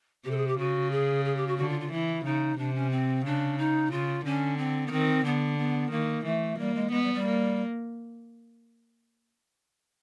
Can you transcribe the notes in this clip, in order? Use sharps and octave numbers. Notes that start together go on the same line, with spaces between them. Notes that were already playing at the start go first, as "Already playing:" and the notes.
C3 G4
A4
G#4
G4
C#3 F#4
G#4
G#4
G4
F#4
D3 F#4
F4
F4
E3 E4
C#3 D#4
C3 D4
C#4
C4
C#3 D4
D#4
C#3 F4
D3 C#4
C4
B3
D#3 C4
D3 B3
B3
D#3 A#3
E3 A3
G3 A#3
G#3
G#3 B3
G3
G3
A#3